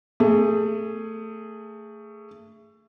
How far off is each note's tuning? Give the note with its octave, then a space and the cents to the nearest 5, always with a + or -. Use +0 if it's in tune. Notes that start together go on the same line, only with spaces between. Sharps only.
A3 +20 G#4 +0